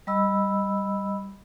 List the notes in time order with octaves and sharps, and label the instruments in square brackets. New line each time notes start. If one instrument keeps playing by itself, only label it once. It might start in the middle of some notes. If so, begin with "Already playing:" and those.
[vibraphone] G3 D#5 B5 E6